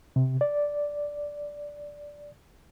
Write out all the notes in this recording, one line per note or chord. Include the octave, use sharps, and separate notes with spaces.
C3
D5